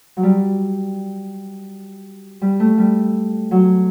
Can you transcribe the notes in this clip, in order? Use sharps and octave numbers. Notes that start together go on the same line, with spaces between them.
F#3
G3
G3
A3
G3
F#3